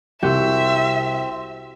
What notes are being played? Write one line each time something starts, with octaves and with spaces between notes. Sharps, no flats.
C2 C4 F#4 G4 E5 G5